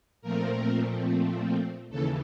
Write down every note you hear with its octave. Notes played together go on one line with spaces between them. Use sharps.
A#2 F3 A3 C4 A#4
D#2 C#3 E3 A4